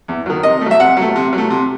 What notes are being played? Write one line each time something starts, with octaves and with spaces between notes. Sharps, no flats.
E2
D#3 F#3
C3 D#5
A3
F#3 E5
C3 F#5
F#3 A3
C3
F#3
A3
C3